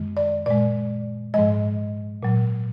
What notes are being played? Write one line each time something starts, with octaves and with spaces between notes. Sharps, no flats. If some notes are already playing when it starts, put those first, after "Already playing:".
Already playing: F#2 D#3 G#3
D5
A#2 G#3 D5
G#2 F3 G#3 D#5
A#2 F#3